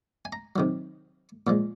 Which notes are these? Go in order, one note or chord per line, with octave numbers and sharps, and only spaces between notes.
G#5
A#5
C3 D#3 F#3
A#2 F3 G#3